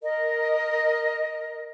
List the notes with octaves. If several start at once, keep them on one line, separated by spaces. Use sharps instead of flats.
A#4 D#5